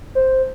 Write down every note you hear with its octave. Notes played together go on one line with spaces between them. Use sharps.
C5